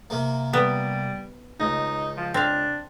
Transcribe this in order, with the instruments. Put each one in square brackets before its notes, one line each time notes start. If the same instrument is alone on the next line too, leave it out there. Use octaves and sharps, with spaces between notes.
[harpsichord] C3 A#3
[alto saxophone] G3 [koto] B3
[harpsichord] C#2 [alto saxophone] D#4
[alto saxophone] F3
[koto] C4 F5 [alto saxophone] D4